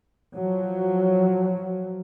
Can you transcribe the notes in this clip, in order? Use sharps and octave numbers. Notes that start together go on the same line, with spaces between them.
F3 F#3